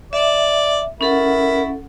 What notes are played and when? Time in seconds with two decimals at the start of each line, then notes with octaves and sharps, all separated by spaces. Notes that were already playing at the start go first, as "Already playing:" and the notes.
0.13 D5 E5
1.01 C#4 E4 A4 A#4 F#5